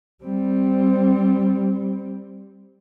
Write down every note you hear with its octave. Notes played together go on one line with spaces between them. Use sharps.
G3 C4